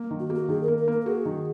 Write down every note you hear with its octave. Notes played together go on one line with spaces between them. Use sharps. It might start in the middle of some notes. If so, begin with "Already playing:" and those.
Already playing: A#3
D#3
F#4
A#3 F#4 G#4
D#3 G#4
A#4
A#3
A#4
A#3 A#4
A#4
F#4 G#4
D#3